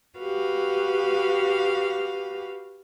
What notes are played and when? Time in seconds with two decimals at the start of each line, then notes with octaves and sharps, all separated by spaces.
0.21 F#4 G4 B4 F5